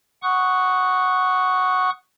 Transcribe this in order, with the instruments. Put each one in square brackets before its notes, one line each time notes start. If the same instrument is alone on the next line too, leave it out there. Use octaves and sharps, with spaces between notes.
[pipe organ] F#5 C#6 D#6 F#6